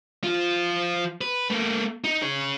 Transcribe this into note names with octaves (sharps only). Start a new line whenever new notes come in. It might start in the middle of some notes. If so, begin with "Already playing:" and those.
F3 F4
B4
A3 A#3
D#4
G#4 C#5